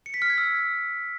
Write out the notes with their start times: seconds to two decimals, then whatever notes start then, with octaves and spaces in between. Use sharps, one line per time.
0.06 C#7
0.14 B6
0.22 F6
0.30 G#6
0.38 E6